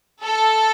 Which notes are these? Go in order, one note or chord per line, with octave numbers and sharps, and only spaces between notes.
A4